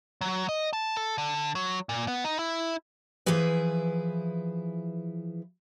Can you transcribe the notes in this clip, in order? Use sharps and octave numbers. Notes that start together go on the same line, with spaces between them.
F#3
D#5
A5
A4
D3
F#3
A#2
B3
D#4
E4
E3 F3 E4 G#4 B4